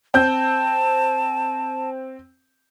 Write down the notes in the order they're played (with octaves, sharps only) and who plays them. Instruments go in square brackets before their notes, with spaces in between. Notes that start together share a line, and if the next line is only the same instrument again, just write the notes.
[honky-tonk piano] C4 G6 [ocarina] A5